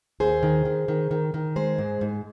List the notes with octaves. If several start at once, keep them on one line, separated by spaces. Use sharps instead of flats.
D#2 G#4 C5
D#3
D#3
D#3
D#3
D#3
G#3 G#4 C5
G#2
G#2